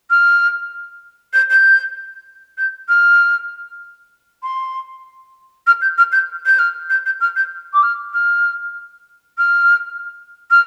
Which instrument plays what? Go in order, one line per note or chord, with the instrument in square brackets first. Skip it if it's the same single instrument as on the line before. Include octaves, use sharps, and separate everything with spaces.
[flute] F6
G6
G6
G6
F6
C6
F6
G6
F6
G6
G6
F6
G6
G6
F6
G6
D6
F6
F6
F6
F6